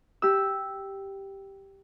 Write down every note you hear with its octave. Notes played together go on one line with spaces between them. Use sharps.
G4 E6